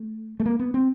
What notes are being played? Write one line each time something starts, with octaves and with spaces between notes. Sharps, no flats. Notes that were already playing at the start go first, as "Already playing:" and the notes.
Already playing: A3
A3
A#3
B3
C4